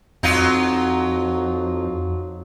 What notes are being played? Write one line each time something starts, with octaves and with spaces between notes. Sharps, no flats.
F2 F#3 D#4 F4